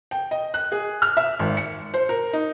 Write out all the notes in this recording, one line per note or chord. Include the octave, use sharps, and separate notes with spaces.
G5
D#5
F#6
G#4
F6
E5
G#1
C#7
C5
A#4
D#4